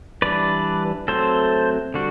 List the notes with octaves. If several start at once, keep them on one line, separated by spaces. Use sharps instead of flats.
E3 G3 D4 B4 D5
F#3 A3 C4 A4 C5
D3 G3 D4 F#4